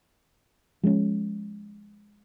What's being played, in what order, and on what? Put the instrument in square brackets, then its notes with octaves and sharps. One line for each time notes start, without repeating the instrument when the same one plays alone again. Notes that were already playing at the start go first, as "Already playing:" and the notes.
[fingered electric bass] F3 G#3 A#3 C#4